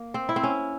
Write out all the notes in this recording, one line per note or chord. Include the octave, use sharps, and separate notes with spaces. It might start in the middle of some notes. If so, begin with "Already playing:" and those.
Already playing: A#3
C4
E4
C4
C#4